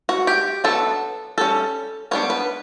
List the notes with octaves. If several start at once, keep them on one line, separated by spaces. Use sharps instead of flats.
F#4
G4
F#3 B3 D4 A4
G3 C#4 A4
G3 B3 D4 C#5
B4